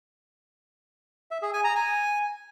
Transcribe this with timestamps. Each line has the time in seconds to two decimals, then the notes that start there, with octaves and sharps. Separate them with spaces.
1.31 E5
1.42 G#4
1.53 G#5
1.64 A#5
1.75 G#5